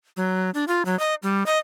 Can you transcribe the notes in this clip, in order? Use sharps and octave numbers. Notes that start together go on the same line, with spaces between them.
F#3
D4
F4
F#3
D#5
G3
D#5